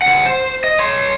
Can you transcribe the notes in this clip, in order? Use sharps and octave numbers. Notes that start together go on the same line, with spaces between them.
C#2 F#5
C5
D#5
C#5 C6